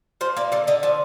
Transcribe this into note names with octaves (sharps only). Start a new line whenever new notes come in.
F3 C5
A#3 D5
D3 D5
D3 D#5
F3 D5